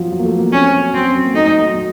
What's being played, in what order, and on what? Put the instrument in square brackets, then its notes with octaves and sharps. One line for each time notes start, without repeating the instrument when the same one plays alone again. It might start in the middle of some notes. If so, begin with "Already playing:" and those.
Already playing: [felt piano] F3 F#3
F#3
A#3
A3
A#3
[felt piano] C4 [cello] C#4
[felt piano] F#3
[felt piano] F#3 [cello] C4
[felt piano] F#3
F#3
A#3
[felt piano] A3 [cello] D#4
[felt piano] F#3
F#3
F#3